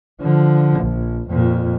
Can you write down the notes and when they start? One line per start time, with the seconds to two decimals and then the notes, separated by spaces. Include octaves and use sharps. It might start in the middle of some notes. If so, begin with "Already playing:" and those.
0.21 D3 F3
0.80 A#1
1.30 F2 A#2